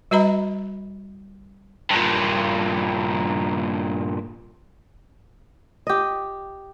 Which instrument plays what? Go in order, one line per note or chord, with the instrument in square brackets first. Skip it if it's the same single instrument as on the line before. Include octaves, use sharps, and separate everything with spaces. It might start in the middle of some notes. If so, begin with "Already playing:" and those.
[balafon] G3 F#4 B4 D#5 A#5 B5
[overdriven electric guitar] G2 A#2
[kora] G4 D#5